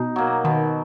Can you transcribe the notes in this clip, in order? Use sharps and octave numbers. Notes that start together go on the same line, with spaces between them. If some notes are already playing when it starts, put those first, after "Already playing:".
Already playing: B2 D#4
F#3 A#3
B2 D#3